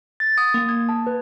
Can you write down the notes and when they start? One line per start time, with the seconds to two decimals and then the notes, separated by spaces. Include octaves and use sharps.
0.20 A6
0.38 D#6
0.54 A#3
0.69 G#6
0.89 A5
1.07 B4